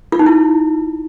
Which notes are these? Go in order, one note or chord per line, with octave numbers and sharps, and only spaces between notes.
F4
D#4
E4